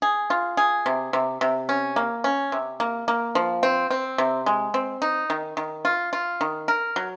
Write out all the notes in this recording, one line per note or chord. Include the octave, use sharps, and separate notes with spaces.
G#4
F4
G#4
C3
C3
C3
C#4
A#3
C#4
C3
A#3
A#3
F3
C4
C4
C3
G#3
C4
D#4
D#3
D#3
F4
F4
D#3
A#4
F#3